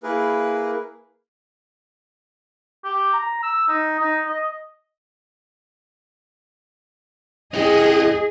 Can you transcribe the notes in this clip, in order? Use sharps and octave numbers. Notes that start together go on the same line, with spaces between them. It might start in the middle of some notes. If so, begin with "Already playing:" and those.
A#3 E4 G#4 A#4 B4
G4
A#5
E6
D#4
D#4
D#5
E4 G4 G#4 D#5